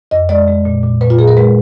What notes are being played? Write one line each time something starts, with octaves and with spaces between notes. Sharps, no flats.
F2 D#5
G#3 D5
G#3
A#2
A#2
A#2 B4
F4
A#2 G#4
A#4
G#3 B4